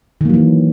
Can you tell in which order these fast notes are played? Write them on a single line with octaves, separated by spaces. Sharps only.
D#3 A#3 F#3 E3